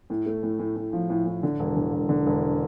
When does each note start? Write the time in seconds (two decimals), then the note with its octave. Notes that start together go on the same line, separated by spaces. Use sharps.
0.10 A2
0.26 A3
0.43 A2
0.59 A2
0.76 A2
0.93 F3
1.10 A2
1.26 A2
1.43 D3
1.60 E1
1.76 D3
1.93 E1
2.09 D3
2.26 E1